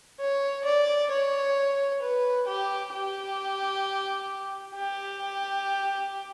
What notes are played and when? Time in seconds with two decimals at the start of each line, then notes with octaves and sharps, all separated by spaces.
0.20 C#5
0.65 D5
1.10 C#5
2.02 B4
2.47 G4
2.92 G4
4.75 G4